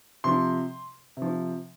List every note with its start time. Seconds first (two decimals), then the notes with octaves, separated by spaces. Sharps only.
0.24 C3 F3 C6
1.17 C3
1.22 F3